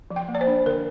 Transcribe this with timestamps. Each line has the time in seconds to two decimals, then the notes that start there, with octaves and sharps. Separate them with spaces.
0.11 F3
0.16 G5
0.28 A#3
0.35 D5
0.41 C5
0.47 D4
0.66 D3 A#4